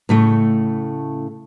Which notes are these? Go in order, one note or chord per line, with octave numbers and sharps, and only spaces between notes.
A2 C#3 A3